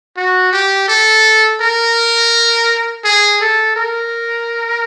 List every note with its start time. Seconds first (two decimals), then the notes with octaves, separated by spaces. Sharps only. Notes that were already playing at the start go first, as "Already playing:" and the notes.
0.17 F#4
0.53 G4
0.88 A4
1.61 A#4
3.04 G#4
3.41 A4
3.76 A#4